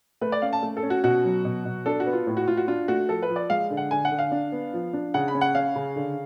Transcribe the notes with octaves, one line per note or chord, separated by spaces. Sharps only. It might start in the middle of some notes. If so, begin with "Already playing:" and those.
A3 B4
D5
C#4 F5
A5
A3
A4
C#4
F#4
B2 F#4
F#3
B2
B2
D4 A4
F#4
B3
F4
A2
F#4
A2 F4
F#4
D4 F4
A3 F#4
F3 A4
B4
F3
D5
G#3 F5
D3
F#5
D3 G#5
F#5
D3
F5
D4
B3
F3
D4
C#3 F#5
B5
C#4
F#5
C#4 F5
C#3
D3